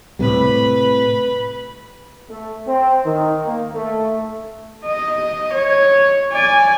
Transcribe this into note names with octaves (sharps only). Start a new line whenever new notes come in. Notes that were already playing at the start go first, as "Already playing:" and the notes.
A2 C3 G3 B4 B5
A3
C4
D#3
A#3
A3
D#5
C#5
D5 G#5